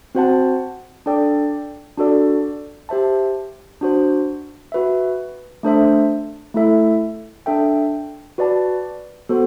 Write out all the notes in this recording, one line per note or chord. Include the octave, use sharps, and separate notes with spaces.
C4 F#4 C5 F#5 A5
D4 A4 D5 G5
D4 F#4 A4 D5
G4 C5 E5 A5
D4 F#4 C5
F#4 B4 E5
A3 D4 A4 C5 E5
A3 E4 A4 E5
D4 A4 E5 G5
F#4 B4 D5 A5
B3 F#4 A4 C5